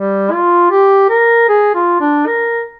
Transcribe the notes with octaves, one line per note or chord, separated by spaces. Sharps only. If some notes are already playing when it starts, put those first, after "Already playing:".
Already playing: G3
F4
G4
A#4
G#4
F4
D4
A#4